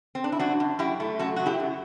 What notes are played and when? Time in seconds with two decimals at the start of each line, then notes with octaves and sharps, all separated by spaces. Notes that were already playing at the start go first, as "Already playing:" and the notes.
0.15 C4
0.24 D4
0.32 E4
0.39 F#2 D4 F#4
0.60 F#2
0.79 F#2 E4 G4
1.00 A3
1.19 F#2 F#4 A4
1.36 F#3 F#4
1.46 E4 G4
1.60 F#2